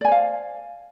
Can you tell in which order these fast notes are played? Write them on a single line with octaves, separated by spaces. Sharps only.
D5 G#5 C5 F5